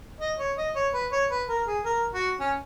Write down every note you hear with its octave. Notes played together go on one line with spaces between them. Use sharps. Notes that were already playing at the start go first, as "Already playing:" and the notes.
D#5
C#5
D#5
C#5
B4
C#5
B4
A#4
G#4
A#4
F#4
C#4